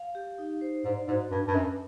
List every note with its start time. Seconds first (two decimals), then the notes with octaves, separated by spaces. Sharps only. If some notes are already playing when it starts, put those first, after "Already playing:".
Already playing: F5
0.15 G4
0.38 D#4
0.61 C5
0.84 G#2 D5
1.08 G#2 F#4
1.31 G2 D4
1.47 G2
1.54 F#2 B4